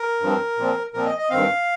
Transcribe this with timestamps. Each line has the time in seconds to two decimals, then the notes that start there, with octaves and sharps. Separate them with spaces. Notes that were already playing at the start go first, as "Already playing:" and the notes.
Already playing: A#4
0.21 G2 F3 C4
0.57 A#2 F3 C4
0.94 A#2 F3 C4 A#4
1.06 D#5
1.18 D#5
1.30 G2 D#3 C4 F5